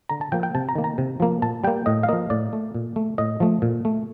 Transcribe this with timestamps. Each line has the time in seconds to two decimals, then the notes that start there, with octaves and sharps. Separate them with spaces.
0.09 D3 A#5
0.21 A5
0.32 F3 A#3 G5
0.43 G5
0.55 C3 A5
0.69 A#5
0.76 D#3 A#3
0.84 A#5
0.98 C3
1.20 F3 A#3
1.42 A#2 A5
1.64 G3 A#3 G5
1.86 A2 D#5
2.03 F5
2.09 F3 A#3 D#5
2.30 A2 D5
2.53 A3
2.74 A#2
2.96 A3
3.18 A2 D#5
3.40 F3 A3
3.62 A#2
3.85 A3